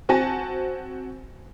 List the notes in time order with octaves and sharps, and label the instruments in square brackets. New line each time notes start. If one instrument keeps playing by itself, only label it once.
[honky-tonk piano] C4 F#4 G#5 A5 A#6